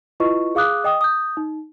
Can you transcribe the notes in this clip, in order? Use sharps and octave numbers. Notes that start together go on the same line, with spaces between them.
E4 F4 B4 D#5 C#6
G#4 F5 D6 D#6 F#6
D#5 G5 D#6
D#6 G6
D#4